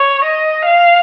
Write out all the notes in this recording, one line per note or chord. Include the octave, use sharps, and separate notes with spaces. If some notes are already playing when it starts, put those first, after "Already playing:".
Already playing: C#5
D#5
F5